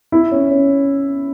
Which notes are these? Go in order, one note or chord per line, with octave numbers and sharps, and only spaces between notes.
E4
C#4
C#4